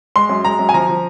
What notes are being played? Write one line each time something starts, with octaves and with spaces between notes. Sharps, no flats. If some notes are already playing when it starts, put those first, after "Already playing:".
G#3 C6
F#2
G#3 A#5
F#2
G#5
F3 A#5
F3